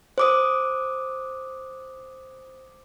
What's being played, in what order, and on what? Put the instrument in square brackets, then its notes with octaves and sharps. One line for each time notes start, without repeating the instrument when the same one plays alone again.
[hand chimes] C5 D6 D#6